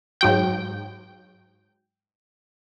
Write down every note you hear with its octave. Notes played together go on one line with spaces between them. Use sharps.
G#2 F#3 G5